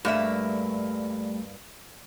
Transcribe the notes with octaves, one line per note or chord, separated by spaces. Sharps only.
G2 G3 A3 A#3 E5